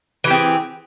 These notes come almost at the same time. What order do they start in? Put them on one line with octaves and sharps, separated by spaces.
E3 G4 C4 G#4